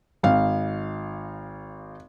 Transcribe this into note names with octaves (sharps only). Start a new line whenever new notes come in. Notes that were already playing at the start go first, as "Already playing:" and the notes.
G#1 F5